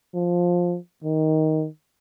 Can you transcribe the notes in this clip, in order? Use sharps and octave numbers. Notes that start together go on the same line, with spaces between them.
F3
D#3